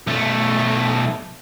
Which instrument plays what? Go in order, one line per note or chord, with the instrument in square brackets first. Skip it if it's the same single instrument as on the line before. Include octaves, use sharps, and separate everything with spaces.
[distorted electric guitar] B1 A3